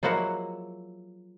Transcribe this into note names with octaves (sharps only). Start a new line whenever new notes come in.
F3 F#3 G#3 A#3 E4 F#4